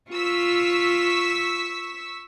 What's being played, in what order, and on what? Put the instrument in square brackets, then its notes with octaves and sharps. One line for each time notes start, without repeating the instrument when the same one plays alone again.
[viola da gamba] F4 [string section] C#6 E6 B6